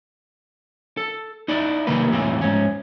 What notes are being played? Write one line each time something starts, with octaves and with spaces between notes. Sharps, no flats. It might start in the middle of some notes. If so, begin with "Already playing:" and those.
A4
D#4 E4 D5 E5
C3 D#3 G3 A#3 B4
E2 A2 E3 G3 C4 C#4
G#2 C#4